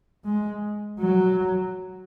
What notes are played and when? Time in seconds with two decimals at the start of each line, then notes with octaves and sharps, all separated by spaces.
0.25 G#3
1.00 F#3